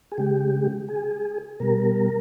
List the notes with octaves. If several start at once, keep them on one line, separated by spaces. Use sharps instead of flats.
G#4
C#3 G#3 G4
G#4
B2 G3 A#4